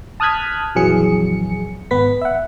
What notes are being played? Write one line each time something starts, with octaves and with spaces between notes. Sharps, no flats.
A5 D#6 F6 F#6 G#6 B6
A#1 F2 E3 F#3 G#4 C#7
G#1 B3 B4 B6
E5 F#5